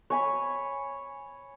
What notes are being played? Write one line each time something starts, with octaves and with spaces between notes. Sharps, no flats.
C#5 G#5 B5